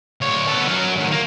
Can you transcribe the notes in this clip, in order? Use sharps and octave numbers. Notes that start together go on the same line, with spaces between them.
D2 C#5
B3 A4
F#3 A#4
D2 D#3
A#3